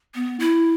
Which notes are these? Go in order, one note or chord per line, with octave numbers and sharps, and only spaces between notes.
B3
E4